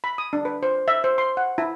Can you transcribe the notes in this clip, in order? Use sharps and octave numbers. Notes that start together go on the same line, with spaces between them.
B5
D#6
D4
B4
C5
E5
C5
C6
F#5
E4